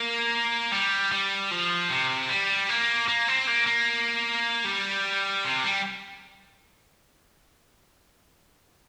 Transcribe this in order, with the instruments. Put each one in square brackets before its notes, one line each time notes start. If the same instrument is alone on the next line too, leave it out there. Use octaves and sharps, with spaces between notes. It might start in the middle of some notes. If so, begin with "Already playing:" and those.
Already playing: [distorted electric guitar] A#3
G3
G3
F3
C3
G3
A#3
A#3
C4
A#3
A#3
G3
C3
G3